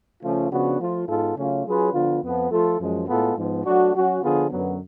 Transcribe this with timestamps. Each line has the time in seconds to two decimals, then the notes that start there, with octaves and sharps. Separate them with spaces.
0.22 C#3 F3 A3 C#4 F4
0.50 C#3 F3 B3 D4 F#4
0.79 F3 A3 F4
1.07 G#2 G#3 B3 F4 A4
1.36 C#3 F#3 A3 C#4 F4
1.65 F#3 C#4 F4 G#4 B4
1.93 D3 F3 B3 F4
2.22 F2 F3 B3
2.50 F3 A3 F4 A4
2.79 F#2 F3 G#3
3.07 A2 G#3 B3 F4 A4
3.35 G#2 F3 B3
3.64 F#3 A3 D4 F#4
3.94 F#3 C#4 F#4
4.22 D3 F3 B3 F4 G#4
4.50 F#2 D3 F#3 B3